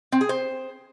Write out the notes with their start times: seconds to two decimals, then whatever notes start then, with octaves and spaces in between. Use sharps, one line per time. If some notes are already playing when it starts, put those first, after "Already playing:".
0.12 C4
0.21 G#4
0.29 C5